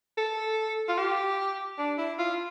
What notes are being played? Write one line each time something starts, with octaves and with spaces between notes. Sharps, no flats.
A4
F4
G4
D4
E4
F4